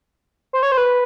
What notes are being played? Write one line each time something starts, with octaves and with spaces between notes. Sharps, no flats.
C5
C#5
C5
B4